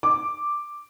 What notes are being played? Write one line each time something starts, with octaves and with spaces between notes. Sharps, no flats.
D6